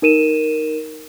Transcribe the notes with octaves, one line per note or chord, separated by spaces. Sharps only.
D#4 A#4 D#7 E7